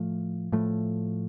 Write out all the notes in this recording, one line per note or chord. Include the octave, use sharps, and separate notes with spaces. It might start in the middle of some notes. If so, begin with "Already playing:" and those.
Already playing: A2 F3 A3
A2 F3 A3